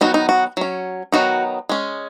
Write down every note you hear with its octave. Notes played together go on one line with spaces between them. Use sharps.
D#3 F#3 B3 D#4 F#4
D#4
F#4
F#3 C#4
D#3 F#3 B3 D#4 F#4
G#3 C#4